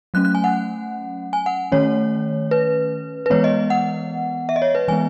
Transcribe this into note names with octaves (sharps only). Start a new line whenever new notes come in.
F#3 A3 C#4 F#6
F#6
G#5
F#5
G#5
F#5
D#3 A3 C#4 C#5
B4
B4
E3 G#3 B3 C#5
D#5
F#5
E5
D#5
C#5
B4
E3 G#3 B3 G#5